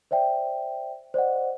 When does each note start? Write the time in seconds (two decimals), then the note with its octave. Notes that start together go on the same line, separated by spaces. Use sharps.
0.11 C5 D5 E5 G5
1.14 C5 D5 D#5 F#5